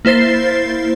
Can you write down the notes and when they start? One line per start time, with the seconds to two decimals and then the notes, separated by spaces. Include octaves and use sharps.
0.05 A#3 E4 C5 A6 C7